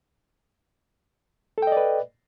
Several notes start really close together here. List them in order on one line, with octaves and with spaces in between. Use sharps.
A4 G5 D#5 D5 B4